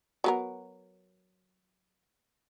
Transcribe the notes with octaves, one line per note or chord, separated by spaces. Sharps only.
F#3 B3 A#4